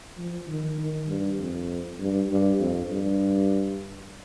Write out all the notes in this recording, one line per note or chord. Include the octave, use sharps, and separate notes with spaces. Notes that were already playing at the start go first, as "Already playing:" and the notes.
F3
D#3
D#3
G2
F2
G2
G2
F2
G2